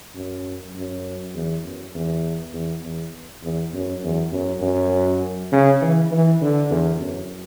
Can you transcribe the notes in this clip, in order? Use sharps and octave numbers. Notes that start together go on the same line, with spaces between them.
F#2
F#2
E2
F#2
E2
E2
E2
E2
F#2
E2
F#2
F#2
C#3
E3
E3
D3
E2
F#2